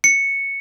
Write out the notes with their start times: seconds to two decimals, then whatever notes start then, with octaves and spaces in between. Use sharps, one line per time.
0.04 C#7